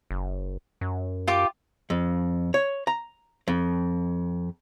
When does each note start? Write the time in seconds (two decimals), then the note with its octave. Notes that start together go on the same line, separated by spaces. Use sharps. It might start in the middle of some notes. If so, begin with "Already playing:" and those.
0.11 F#1
0.81 F#2
1.27 F4 G4 D6
1.90 F2
2.54 C#5
2.87 A#5
3.48 F2